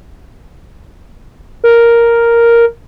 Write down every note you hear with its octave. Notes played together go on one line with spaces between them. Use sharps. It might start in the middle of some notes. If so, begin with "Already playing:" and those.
A#4